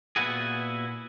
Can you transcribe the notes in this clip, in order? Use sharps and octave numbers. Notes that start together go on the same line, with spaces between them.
A#2 B3 E4 F#4 G#4